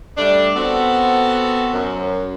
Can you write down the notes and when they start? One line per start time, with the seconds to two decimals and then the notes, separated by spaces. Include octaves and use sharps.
0.17 G3 A3 D4
0.56 B3 C4 F#4 A4
1.74 F#2